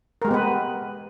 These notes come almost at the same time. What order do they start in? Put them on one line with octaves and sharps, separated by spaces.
A#4 G#3 G4 B3 B4